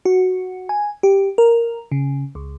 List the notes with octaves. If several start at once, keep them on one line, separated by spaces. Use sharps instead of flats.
F#4
G#5
G4
A#4
C#3
C#2